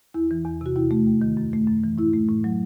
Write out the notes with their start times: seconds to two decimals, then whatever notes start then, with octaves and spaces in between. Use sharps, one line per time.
0.14 E2 E4
0.31 E3
0.45 E2
0.61 C3 F#4
0.76 D#2 E4
0.91 A3
1.06 D#2
1.22 D#3
1.37 F#2
1.53 A3
1.67 F#2
1.84 E3
1.98 A2 E4
2.14 A3
2.29 A2
2.44 F#3